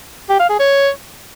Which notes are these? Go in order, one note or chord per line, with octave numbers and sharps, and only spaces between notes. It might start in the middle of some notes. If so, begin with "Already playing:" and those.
G4
F5
G#4
C#5